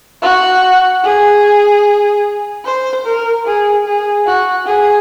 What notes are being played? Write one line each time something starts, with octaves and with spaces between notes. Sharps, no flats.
F#4
G#4
C5
A#4
G#4
G#4
F#4
G#4